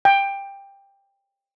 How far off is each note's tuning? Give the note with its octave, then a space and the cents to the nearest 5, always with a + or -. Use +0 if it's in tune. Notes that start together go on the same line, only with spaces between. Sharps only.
G5 +15